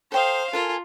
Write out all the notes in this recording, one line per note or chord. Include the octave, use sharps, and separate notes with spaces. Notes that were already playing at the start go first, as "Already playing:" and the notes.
A4 C5 F5 G5 D#6
F4 A4 A#4 G#5